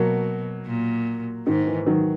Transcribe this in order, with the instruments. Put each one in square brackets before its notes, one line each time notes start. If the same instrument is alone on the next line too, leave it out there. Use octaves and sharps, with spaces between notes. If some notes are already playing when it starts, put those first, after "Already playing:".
Already playing: [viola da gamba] B2 [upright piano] F#3 A#3
[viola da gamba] A#2
[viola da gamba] G#2 [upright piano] D#3
[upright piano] E3
D#3 F#3